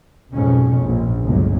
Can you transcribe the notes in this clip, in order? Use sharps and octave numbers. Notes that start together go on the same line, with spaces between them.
B1 F2 G#2 B2 C#4
A#1
G1 C#2 F#3